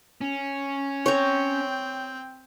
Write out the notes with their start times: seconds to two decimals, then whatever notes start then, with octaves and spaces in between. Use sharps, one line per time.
0.21 C#4
1.06 C4 C#5 G5 A#5